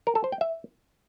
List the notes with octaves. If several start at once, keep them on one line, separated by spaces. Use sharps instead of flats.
A#4
A4
C5
G5
E5